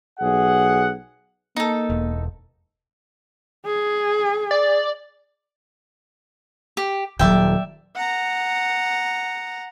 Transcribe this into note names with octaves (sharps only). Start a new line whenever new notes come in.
B1 G#4 F#5
A#3 D#4 A4
E1
G#4
D5
G4
D#1 D#3 F#3 D5 E5 G5
F#5 A#5